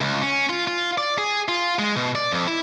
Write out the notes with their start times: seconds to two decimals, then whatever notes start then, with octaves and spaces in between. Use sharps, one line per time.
0.01 C#2
0.22 C#4
0.50 F4
0.67 F4
0.98 D5
1.18 G#4
1.48 F4
1.79 G#3
1.96 B2
2.15 D5
2.31 F2
2.47 E4